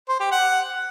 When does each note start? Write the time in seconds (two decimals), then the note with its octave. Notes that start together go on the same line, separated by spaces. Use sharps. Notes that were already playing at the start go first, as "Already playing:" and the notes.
0.08 C5
0.20 G4
0.32 F#5